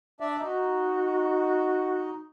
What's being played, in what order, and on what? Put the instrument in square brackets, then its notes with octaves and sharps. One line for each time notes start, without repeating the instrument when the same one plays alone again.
[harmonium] D4 D5 E5
[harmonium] D#4 [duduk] F#4